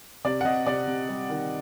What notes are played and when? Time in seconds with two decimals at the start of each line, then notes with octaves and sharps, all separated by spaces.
0.24 C3 D5
0.41 F#5
0.45 C3 D#5
0.66 C3 D5
0.87 C3
1.09 G3
1.30 D#3